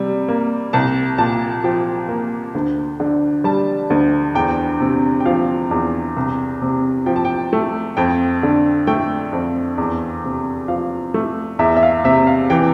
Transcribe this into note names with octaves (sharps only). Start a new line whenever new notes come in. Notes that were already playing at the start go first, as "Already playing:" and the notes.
Already playing: C3 G3
A#3
C2 A5
A#2 A5
F3 G5
A#3
D2
D3
G3 A5
D2
E2 G5
C3
G5
F3 F5
E2
C2
C3
F3 G5
A5
G5
A3
F2 G5
D3
A3 G5
F2
E2
C3
F3 F5
A3
E2 E5
E5
F5
C3 E5
F5
E3 G5